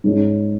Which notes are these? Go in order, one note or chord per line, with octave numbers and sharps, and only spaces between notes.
G#2 G#3 C#4